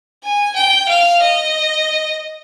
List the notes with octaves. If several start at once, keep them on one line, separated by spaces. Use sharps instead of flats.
G#5
G5
F5
D#5